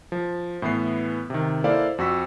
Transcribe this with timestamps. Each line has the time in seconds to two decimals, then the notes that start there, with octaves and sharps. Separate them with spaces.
0.12 F3
0.62 A2 E3 B3 C7
1.30 C3 D#3
1.64 A#3 E4 A4 C5 D5 F5
1.98 F2 F#4 E6 B6